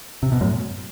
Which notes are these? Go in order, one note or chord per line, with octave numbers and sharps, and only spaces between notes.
C3
B2
F#2 A2